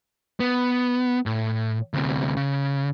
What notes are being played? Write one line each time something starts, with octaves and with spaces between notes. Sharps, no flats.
B3
A2
D2 C3
C#3